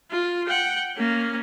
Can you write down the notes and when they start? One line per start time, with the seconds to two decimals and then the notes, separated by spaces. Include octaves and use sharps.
0.11 F4
0.47 F#5 G5
0.97 A#3 C#4